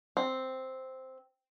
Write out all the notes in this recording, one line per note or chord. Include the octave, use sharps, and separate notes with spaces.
C4